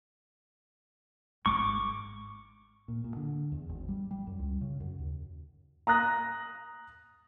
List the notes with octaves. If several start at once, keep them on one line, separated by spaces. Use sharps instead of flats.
G#1 C#6 D6
A#2
A#2
D3
E2
G#1
G3
G3
F#2
C#2
C#3
F#2
D#2
A#5 D#6 F#6 A#6